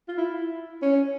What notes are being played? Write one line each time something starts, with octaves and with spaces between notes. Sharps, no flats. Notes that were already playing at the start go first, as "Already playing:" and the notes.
F4
E4
C#4